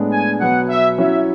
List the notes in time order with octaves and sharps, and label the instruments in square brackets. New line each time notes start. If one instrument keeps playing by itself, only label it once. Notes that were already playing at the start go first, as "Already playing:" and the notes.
Already playing: [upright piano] A2 G#3 B3 D4
[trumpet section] G#5
[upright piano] B2 F#3 B3 [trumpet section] F#5
[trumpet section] E5
[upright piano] F#3 C#4 E4 [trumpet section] E5